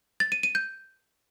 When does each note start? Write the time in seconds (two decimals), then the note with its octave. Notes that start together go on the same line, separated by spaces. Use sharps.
0.20 A6
0.32 D#7
0.43 D#7
0.55 G6